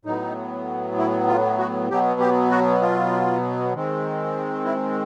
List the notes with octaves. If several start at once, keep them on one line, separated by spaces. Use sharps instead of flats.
A2 F#3 B3 D#4
E4
F4
F#4
B2 F#3 B3 G4
G4
F#4
F4
D#3 G#3 C4
E4